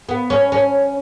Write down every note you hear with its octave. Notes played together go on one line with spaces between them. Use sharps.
B3
C#4
C#4